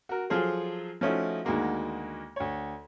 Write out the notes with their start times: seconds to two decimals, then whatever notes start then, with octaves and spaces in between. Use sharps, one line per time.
0.09 F#4 A#4
0.30 F3 F#3 F4 G#4 A4
1.01 F3 A3 C#4 D#4 E4 F#4
1.45 D2 D#3 G#3 A#3 F#4
2.36 D2 C#5